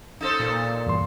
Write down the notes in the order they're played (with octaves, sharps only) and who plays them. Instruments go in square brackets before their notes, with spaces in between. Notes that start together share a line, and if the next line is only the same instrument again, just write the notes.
[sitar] D#4 A4 C5
[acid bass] A#2
[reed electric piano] E2 G2 C6